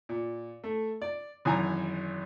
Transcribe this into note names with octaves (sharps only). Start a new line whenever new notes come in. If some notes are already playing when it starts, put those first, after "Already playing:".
A#2
A3
D5
G#1 F#2 E3 G#5 A#5